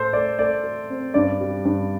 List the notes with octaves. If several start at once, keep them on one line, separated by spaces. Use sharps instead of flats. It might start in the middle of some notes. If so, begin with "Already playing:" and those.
Already playing: A2 A3 A4 C5
A3 D5
A3 D5
A4
C4
G2 D5
G3
G2